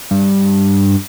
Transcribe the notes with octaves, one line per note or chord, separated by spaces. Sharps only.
G2